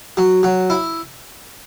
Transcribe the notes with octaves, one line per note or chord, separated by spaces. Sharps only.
F#3
F#3
E4